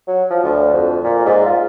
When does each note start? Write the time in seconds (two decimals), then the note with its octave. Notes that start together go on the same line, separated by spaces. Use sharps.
0.07 F#3
0.30 F3
0.44 D2
0.73 F2
1.04 A#2
1.25 G#2
1.45 F4